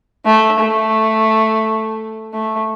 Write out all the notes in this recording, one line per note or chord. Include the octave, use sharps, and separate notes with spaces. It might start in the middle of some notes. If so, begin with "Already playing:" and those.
A3
A3
A3